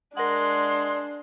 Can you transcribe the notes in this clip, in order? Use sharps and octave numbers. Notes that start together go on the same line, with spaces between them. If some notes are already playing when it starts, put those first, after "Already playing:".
G#3 D4 A#4 F#5 C6